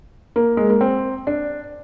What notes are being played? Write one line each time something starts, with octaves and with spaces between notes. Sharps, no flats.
A#3
G#3
A#3
C4
D4